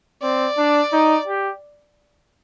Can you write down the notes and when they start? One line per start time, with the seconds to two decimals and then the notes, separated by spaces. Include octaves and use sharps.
0.22 C4 D5
0.57 D4
0.92 D#4
1.27 G4